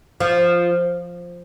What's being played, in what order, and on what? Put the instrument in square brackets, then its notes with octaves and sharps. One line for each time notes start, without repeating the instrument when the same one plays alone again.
[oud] F3